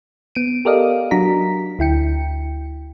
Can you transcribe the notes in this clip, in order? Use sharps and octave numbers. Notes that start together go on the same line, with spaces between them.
B3 D7 D#7
G4 A4 A#4 D5 D#5 F5
F#3 D4 F#4 A#5 B6
D2 E4 G5 C#7